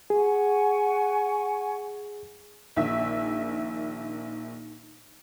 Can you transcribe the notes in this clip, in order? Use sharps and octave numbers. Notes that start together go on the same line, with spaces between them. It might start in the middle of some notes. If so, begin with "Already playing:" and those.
G#4 F#5 G#5 C#6
A#1 D#3 E5